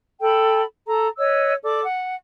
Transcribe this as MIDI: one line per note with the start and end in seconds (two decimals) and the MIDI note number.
0.20 0.62 69
0.20 0.62 79
0.20 0.62 83
0.85 1.07 69
0.85 1.07 82
1.18 1.53 71
1.18 1.53 73
1.18 1.53 75
1.18 1.53 88
1.62 1.83 69
1.62 1.83 74
1.62 1.83 86
1.84 2.15 78